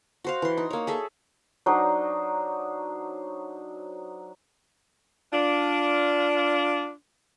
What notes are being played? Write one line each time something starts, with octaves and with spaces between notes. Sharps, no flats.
F#4 C5 F5
E3 C6
D#4
A#3 C#5
G#4 A4 E5
F#3 D4 D#4 C5
D4 F4